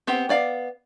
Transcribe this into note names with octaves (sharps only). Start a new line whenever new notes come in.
B3 C4 G4
B3 D5 F5